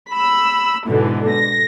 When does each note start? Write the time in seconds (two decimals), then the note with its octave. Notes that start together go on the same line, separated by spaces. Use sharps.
0.11 B5 E6
0.85 G#2 B2 D3 E3
1.32 A#6